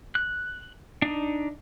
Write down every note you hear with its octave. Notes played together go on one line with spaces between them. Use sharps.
F#6
D4 D#4